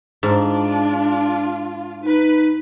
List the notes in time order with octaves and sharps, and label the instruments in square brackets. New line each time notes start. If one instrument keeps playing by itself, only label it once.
[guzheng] G#2 [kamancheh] D4 F4
[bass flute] D#4 [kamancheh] B4